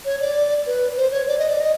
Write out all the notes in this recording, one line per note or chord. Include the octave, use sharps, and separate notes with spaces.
C#5
D5
B4
C5
C#5
D5
D#5
D5
D#5